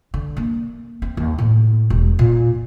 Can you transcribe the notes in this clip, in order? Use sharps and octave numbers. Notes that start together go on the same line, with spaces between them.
D3
A#3
C4
D#2
A2
E1
A#2